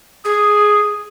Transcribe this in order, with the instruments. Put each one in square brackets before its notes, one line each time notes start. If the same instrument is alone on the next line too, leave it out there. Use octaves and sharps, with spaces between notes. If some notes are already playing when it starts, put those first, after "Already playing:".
[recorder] G#4 [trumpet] D#6